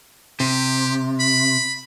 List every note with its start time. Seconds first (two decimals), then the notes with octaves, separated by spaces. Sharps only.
0.40 C3 G4
1.20 B5